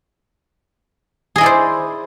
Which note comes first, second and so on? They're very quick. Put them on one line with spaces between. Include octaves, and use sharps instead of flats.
G#4 D#5 E4 D5 C5